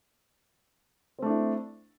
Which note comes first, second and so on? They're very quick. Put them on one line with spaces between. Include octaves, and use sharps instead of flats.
C4 A3 D4 E4